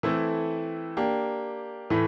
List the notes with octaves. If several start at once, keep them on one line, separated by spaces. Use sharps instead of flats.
E3 A3 C4 E4 A4
A#3 D4 G4
A2 E3 A3